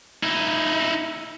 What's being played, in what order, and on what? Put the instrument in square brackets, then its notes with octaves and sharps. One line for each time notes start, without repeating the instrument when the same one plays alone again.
[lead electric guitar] D#4 E4